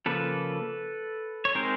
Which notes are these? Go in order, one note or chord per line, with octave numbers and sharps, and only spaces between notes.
C#3 F3 A#3 A4 B4
C#5
G#3 C4 D#4 A#4 C5